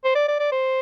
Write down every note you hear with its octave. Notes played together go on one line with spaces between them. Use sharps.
C5
D5
D5
D5
C5